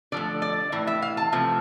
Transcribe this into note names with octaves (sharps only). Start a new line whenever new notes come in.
D3 F3 A3 D5
D5
A2 E3
E5
F5
A5
C3 F3 A3